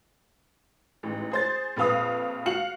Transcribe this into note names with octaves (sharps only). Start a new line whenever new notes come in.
A1 G#2
G#4 C5 A6
A#1 F2 B4 F5 D#6
F#4 F5 C#7 F#7